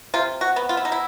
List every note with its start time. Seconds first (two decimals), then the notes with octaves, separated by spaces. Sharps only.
0.14 C3 F4
0.41 F#4
0.56 B3
0.69 F4
0.77 E4
0.85 D#4
0.92 E4